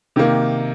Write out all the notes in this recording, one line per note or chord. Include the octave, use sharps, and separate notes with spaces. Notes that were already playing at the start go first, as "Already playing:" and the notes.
C3 D#3 A#3